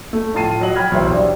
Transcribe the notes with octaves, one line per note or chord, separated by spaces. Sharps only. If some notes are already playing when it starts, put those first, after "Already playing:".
A3
A2 F3 F4 A5 C7 D#7
F3 F#3 D#5 F#7
G5 B5 F6 G#6
B1 E2 E4 C5
G3 D4